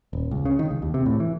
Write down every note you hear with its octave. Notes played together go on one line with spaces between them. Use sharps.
D#1
C#2
C#3
D#3
C#2
D#2
C3
A2
E3